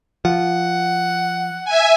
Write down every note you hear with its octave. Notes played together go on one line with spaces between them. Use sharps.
F3 F#5
E5 G#5